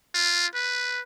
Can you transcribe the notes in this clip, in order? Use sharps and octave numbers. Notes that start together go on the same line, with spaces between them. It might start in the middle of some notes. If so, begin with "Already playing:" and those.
F4
B4